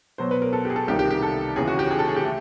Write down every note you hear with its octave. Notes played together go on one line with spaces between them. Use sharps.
B2 F#3 B3 C5
B4
A#4
A4
G4 G#4
A4
C2 C3 D#3 G3 A#3 G4
G4
G4
A4
D#2 C#3 E3 G#4
F#4
G4
G#4
A4
G#4
G4
A3